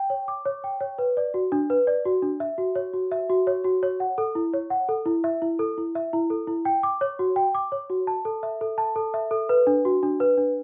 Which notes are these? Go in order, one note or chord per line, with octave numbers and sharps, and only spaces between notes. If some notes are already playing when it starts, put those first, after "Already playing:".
Already playing: G5
C#5
D6
C#5
G5
C#5
B4
D5
F#4
D4
B4
D5
F#4
D4
E5
F#4
C#5
F#4
E5
F#4
C#5
F#4
C#5
F#5
A4
E4
C#5
F#5
A4
E4
E5
E4
A4
E4
E5
E4
A4
E4
G5
D6
C#5
F#4
G5
D6
C#5
F#4
A5
A4
E5
A4
A5
A4
E5
A4
B4
D4
F#4
D4
B4
D4